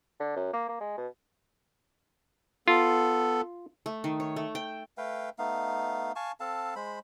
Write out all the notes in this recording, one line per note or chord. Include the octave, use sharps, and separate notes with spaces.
D3
F#2
A#3
A#3
G#3
B2
B3 F4 A4
A3
D#3
C#5
A3
G5
A3 B4 F5 G5
A3 B3 D#4 F5
F5 G#5 A5 C#6
C4 A4 F5 A5
G#3 C5 B5